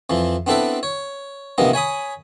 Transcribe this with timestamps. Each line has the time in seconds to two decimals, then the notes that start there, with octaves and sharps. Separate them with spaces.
0.10 F2 E3 F3
0.47 B3 C4 D4 E4 A4 B4
0.83 C#5
1.58 A#1 C3 E3 A#3 B3 D#5
1.73 C#5 G#5 B5 D#6